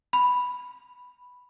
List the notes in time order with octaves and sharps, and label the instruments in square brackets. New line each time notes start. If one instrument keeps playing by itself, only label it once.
[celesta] B5